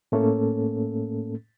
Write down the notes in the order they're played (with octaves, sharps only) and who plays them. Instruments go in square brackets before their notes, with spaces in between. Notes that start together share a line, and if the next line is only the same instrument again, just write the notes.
[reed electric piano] A2 A3 A#3 C#4 A4